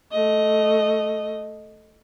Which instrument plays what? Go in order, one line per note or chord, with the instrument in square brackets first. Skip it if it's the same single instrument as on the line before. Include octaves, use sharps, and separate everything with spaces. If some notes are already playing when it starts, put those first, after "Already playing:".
[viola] A3 D#5